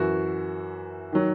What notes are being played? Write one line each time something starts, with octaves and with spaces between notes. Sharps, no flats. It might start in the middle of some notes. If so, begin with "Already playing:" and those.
Already playing: F#2 E3 F#4
D#3 F#3